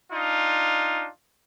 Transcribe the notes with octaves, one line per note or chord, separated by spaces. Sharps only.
D4 D#4 F4